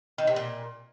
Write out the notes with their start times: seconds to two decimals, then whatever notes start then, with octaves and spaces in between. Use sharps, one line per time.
0.18 D#3
0.27 C3
0.36 A#2